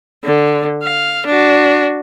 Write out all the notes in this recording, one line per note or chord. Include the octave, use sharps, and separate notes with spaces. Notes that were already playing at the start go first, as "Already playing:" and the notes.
D3
F5
D4 F#4